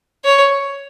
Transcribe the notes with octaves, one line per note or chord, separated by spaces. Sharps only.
C#5